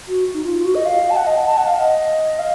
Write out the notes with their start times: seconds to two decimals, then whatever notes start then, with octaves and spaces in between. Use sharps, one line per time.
0.08 F#4
0.34 D#4
0.44 F4
0.55 F4
0.65 F#4
0.75 D#5
0.86 F5
1.10 A5
1.16 F#5
1.26 D#5
1.46 A5
1.57 F#5
1.67 F5
1.78 D#5
2.39 F5